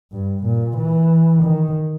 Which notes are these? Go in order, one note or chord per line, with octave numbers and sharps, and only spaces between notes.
G2
A#2
E3
D#3